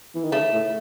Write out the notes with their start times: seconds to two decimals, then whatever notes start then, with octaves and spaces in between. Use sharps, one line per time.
0.15 E3
0.23 D#3
0.32 C#3 A3
0.53 A2